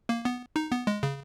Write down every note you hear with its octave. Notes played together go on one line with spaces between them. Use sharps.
A#3
B3
D#4
B3
G#3
C#3